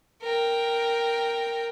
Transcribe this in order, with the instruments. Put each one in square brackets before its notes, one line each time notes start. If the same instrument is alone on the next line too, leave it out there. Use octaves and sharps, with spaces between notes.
[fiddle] A#4 G5